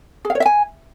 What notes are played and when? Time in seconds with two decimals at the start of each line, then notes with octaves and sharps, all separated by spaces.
0.25 G#4
0.30 F5
0.35 C#5
0.40 E5
0.46 G#5